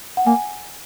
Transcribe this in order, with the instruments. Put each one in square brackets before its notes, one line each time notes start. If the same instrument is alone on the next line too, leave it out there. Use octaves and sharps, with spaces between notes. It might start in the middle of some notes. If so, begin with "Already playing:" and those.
[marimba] F#5
[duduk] A#3 [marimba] G#5